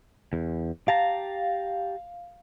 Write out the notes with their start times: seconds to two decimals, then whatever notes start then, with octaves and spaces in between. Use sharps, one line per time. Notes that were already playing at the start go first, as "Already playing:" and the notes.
0.33 E2
0.88 G4 F5 A5 A#5